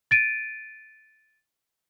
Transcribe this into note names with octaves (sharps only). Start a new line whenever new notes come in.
A6 D7 D#7